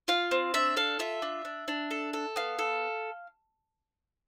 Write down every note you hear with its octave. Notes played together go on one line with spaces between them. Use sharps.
F4 F5
C4
D4 E5
A4 F5
F4 E5
D4
D4
D4
A4
A4
B3 F5
A4